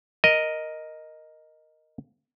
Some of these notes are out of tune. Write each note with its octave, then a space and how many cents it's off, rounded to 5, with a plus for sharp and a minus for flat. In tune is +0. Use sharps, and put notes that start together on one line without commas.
A#4 +0 D#5 +0